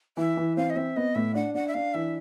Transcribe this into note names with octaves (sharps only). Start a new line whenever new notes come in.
E3 E5
E3
C4 F5
D#5
C4 E5
B3 D#5
A2 E5
D4 F#5
D4 F#5
E5
D4 F5
E3 E5